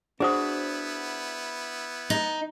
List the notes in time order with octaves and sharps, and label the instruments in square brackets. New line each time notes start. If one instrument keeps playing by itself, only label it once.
[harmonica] B3 E4 [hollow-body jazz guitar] D4 F#4 [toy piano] G#4 C5 D#6
[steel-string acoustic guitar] D#4